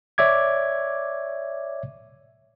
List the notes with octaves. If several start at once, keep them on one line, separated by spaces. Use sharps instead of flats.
C#5 D5 E5 D6 G#6